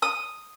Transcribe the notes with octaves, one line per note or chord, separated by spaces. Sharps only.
D#6